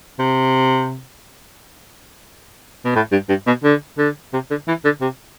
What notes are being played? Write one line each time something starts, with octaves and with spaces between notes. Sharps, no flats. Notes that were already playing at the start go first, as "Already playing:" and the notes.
C3
B2
A2
G2
G2
B2
D3
D3
C3
D3
E3
D3
C3